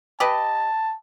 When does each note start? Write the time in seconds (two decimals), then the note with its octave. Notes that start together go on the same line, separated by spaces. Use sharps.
0.20 G4 B4 D#5 A5